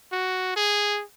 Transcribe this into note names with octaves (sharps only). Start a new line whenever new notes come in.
F#4
G#4